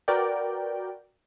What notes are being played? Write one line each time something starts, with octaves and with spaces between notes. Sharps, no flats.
F#4 A#4 B4 D5 G5